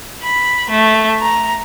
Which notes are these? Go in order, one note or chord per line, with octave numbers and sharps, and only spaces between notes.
B5
A3
A#5